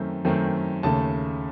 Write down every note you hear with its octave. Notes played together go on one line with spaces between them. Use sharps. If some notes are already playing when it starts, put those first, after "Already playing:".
Already playing: F#2 D#3 A3 C4
F#2 D#3 A3 C4
D#2 C#3 A3 A5